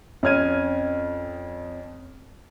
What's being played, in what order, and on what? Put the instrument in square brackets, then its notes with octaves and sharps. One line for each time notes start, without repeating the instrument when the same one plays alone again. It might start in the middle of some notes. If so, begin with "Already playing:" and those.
[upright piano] F2 C#4 F6 G#6 D#7